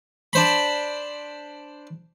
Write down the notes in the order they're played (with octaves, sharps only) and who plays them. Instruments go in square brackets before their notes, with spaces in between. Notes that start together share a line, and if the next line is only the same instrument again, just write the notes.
[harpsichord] D4 C5 B5